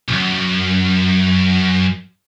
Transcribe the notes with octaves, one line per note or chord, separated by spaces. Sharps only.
B1 F#2